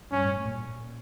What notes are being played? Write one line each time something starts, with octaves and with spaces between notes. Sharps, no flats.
G2 C#4
A2
A#2